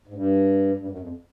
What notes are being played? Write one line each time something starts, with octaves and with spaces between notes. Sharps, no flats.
G#2
G2
G2
F#2
F2